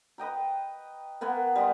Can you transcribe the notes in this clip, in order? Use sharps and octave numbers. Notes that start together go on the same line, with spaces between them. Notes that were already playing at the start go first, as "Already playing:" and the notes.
B4 D#5 G5 A#5
A#3 B3 F#5 G#5
G3 D#5 C6